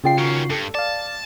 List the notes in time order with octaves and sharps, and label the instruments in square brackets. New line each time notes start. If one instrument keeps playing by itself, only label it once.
[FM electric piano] C#3 F4 C7 [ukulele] G#4 D5 G5
[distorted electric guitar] D#3 C#4 [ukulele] F#4
[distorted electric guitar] G2 [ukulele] A4
[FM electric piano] D5 F5 [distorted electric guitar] A5